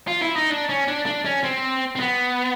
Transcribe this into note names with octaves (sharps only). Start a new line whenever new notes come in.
F4
E4
D#4
D4
C#4
D4
D4
C#4
C4
C4
B3